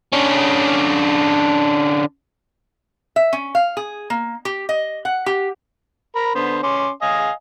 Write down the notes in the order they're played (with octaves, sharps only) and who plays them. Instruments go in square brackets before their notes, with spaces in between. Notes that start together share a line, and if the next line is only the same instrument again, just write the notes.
[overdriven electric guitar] D3 C#4
[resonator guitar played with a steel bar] E5
C#4
F5
G#4
A#3
G4
D#5
F#5
G4
[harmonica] A#4 B5
D3 B3 C5
C#4 C6 D6
D#5 F5 G#5